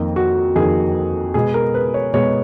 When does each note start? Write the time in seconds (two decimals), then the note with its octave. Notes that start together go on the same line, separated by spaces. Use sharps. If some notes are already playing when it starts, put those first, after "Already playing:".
Already playing: F2 D#3 A#3
0.16 F#4
0.55 F2 D#3 A#3 G#4
1.34 B2 G#3 B3 G#4
1.54 A#4
1.74 B4
1.94 C#5
2.13 B2 G#3 B3 C#5